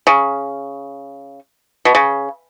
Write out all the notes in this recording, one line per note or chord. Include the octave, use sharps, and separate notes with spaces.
C#3
B2
C#3